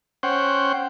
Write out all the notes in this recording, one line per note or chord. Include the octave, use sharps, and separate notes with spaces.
C#4 C5 F#5 G5